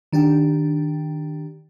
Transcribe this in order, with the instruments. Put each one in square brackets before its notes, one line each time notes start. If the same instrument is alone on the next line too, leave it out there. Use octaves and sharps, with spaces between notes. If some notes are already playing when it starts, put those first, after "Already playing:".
[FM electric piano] D#3 D4 G4 G5